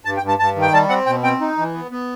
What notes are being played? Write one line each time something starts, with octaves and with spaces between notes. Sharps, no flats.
G2 A5
G5
G2
A5
G2 A5
D#3
G5
G3 A5
C4 F#5
B2 G5
C4 G5
D#4
E3
B3
B3